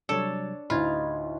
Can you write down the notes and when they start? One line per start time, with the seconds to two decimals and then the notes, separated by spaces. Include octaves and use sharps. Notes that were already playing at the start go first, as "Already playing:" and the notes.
0.09 C3 F#3 G3 D4 A4 C#5
0.70 D2 A2 D#4 F4 B5 G#6